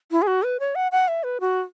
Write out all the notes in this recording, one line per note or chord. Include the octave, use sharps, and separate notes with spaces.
E4
G#4
F#4
B4
C#5
F#5
F#5
E5
B4
F#4